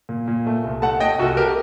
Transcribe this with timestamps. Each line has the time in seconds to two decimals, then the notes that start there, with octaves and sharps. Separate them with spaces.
0.09 A#2
0.28 A#2
0.47 A3
0.64 C2
0.82 A3 F#5 A5
1.00 A3 D#5 G5
1.19 C2 F#4 A4
1.37 G4 A#4